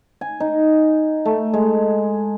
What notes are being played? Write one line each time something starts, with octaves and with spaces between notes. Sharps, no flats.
G#5
D#4
A3
G#3